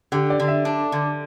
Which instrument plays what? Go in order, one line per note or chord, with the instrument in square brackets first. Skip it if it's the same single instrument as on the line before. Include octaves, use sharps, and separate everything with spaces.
[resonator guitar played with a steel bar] D3 [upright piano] G4
[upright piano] D5
[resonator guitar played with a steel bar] D3
[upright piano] E5
[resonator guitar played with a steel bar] D4
D3